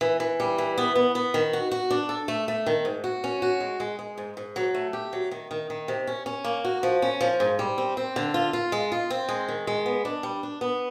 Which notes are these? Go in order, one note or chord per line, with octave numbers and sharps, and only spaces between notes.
E3
E3
G3
E3
B3
B3
B3
D#3
F#4
F#4
D4
A4
A3
A3
D#3
G#2
F#4
C#4
F#4
G#3
G#3
G#3
G#2
G#2
F#3
A3
G4
F#3
D#3
D#3
D#3
C3
C#4
C#4
A#3
F#4
F3
C#4
F3
G#2
G3
C4
C4
D3
F4
F4
G#3
F4
C4
G#3
D#3
G#3
B3
D4
G3
D4
B3